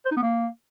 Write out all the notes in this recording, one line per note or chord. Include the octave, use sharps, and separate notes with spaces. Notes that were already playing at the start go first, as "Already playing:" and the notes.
C5
D#4
B3
A#3